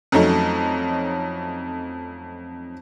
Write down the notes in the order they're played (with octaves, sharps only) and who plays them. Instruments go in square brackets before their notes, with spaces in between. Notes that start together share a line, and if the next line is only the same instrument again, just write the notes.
[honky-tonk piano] F2 F#3 A3 C#4 D#4